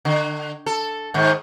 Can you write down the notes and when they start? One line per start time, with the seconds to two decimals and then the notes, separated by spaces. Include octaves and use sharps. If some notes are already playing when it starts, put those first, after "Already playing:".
0.05 D3
0.66 A4
1.14 G#2 D#3